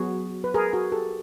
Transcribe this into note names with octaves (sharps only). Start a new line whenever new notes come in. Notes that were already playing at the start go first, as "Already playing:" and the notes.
Already playing: F#3 B3 F#4 G#4
B4
G#4 A#4
F#4 G#4
G4 A4